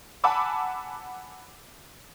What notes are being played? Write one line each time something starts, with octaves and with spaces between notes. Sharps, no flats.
F#5 G#5 A5 B5 D6 E6